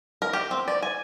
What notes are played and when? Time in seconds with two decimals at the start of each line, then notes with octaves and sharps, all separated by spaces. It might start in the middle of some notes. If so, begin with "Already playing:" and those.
0.22 A#4
0.33 G4
0.51 C4
0.68 D5
0.82 G#5